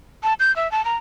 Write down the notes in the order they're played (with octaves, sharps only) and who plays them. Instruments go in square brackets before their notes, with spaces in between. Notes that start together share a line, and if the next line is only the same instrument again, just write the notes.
[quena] A5
G6
E5
A5
A#5